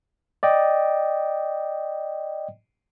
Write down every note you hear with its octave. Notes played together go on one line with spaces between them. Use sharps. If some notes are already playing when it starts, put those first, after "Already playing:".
D5 D#5 G5